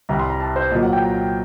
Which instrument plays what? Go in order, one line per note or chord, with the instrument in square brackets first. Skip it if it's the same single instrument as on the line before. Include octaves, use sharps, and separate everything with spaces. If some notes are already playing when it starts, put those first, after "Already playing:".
[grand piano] C2 C3 G3 A#5
C6
A#5
A5
C5
A#2 F#3 A#3 D#5
F#5
G5
A#5